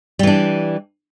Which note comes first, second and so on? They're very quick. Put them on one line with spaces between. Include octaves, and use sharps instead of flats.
G3 E3 D4